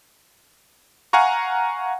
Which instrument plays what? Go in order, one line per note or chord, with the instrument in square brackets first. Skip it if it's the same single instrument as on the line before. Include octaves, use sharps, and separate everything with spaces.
[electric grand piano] F5 F#5 G#5 A#5 C#6